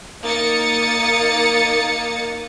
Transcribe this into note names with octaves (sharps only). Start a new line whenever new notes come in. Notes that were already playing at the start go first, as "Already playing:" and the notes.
A#3 D#4 D#6 A6 C#7